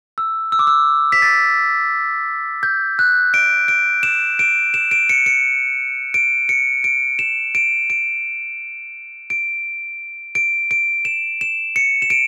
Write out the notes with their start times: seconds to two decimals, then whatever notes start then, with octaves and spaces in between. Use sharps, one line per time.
0.18 E6
0.52 E6
0.59 D6
0.67 E6
1.12 B6
1.22 A6
2.63 G6
2.99 F#6
3.34 D7
3.68 D7
4.03 E7
4.39 D7
4.74 E7
4.91 D7
5.09 C#7
5.26 C#7
6.14 D7
6.49 C#7
6.84 D7
7.19 E7
7.55 D7
7.90 D7
9.30 D7
10.35 D7
10.71 D7
11.05 E7
11.41 E7
11.76 C#7
12.02 E7
12.10 D7